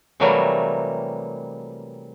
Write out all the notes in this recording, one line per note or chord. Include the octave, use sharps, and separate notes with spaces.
C3 E3 F#3 G3 A3 A#3